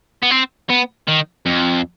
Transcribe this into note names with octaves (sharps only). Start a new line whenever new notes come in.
B3
C4
B3
D#3
F2